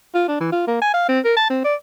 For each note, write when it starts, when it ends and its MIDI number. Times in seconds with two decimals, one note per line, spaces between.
0.15 0.25 65
0.28 0.36 62
0.40 0.48 52
0.52 0.64 65
0.67 0.78 58
0.82 0.89 80
0.94 1.07 77
1.09 1.20 60
1.25 1.36 70
1.37 1.47 81
1.50 1.61 60
1.65 1.75 74